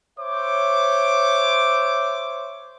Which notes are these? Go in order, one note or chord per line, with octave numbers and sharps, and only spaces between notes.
C5 C#5 E5 D6